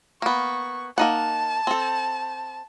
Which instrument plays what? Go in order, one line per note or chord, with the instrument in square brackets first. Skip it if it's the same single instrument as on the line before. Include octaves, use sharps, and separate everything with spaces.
[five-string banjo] A#3 B3 [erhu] C#6
[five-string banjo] A#3 D#4 F#5 [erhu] A5
[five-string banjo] C4 A4